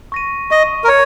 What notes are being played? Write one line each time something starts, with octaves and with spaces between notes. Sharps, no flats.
C#6 A#6 D#7
D#5 C#6 A#6 D#7
A#4
C#5 C#7